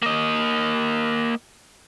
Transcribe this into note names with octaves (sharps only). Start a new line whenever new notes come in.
A#3 D#5